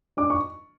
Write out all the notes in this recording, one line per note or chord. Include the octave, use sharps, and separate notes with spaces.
D4 D6
C#6